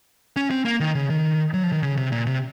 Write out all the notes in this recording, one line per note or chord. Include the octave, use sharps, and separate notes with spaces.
C#4
C4
A#3
D#3
C#3
D#3
F#3
F3
D#3
C#3
C3
A#2
C3